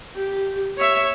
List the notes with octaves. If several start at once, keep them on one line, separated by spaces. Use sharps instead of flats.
G4
C#5 E5